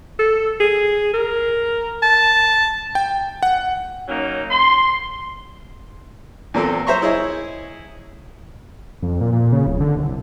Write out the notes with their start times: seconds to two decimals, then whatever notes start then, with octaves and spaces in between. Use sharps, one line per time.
0.19 A4
0.60 G#4
1.13 A#4
2.03 A5
2.95 G5
3.43 F#5
4.08 F#3 A#3 C#4 D#4
4.51 C6
6.54 E2 A#2 A#3 C4 A4 C6
6.87 C5 C#5 E5 A#5 C6 C#6
7.02 E4 G#4 C#5 D#5
9.02 F2
9.21 A#2
9.32 A#2
9.52 C#3
9.67 D1
9.80 D3
9.97 C2